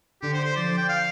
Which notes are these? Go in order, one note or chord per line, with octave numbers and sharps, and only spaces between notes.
D3 G4
C5
C5
F3 D5
G5
F5